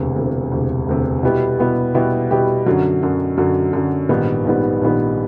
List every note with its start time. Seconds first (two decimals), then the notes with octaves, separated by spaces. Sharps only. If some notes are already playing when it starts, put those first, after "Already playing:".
Already playing: E1 D2 C3
0.15 E1 D2 C3
0.52 E1 D2 C3
0.87 E1 D2 C3
1.23 B2 G3 B3 E4 G4
1.59 B2 G3 B3 E4 G4
1.94 B2 G3 B3 E4 G4
2.31 B2 G3 B3 E4 G4
2.66 F#2 D3 F#3
3.03 F#2 D3 F#3
3.38 F#2 D3 F#3
3.73 F#2 D3 F#3
4.09 A#1 G#2 D#3 G3 B3
4.45 A#1 G#2 D#3 G3 B3
4.81 A#1 G#2 D#3 G3 B3